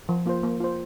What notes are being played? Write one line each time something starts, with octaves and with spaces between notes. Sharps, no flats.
F3
A#3 F4 C5
A#3
F4 C5